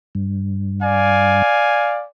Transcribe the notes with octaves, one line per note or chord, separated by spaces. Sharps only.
G2
D5 F5 G#5